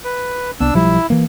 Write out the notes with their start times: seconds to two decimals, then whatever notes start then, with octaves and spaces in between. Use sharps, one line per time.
0.04 B4
0.60 C2 B3 D4 E6
0.74 B1 F3 G3 E4
1.10 E3 A#3